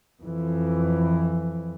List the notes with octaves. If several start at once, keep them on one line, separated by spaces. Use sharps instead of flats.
F2 E3